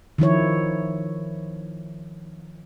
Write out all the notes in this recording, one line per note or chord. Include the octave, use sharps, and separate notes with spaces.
D#3 F3 E4 C#5